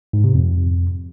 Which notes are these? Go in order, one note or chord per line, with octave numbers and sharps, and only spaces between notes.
G#2
C3
F2